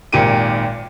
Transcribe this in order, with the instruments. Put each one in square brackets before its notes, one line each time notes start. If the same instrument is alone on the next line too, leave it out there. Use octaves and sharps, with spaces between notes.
[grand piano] G#1 A#2 D#3 G4 D7 D#7